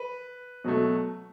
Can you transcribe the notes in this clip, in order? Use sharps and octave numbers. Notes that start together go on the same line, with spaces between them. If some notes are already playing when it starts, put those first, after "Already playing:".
Already playing: B4
B2 F#3 A3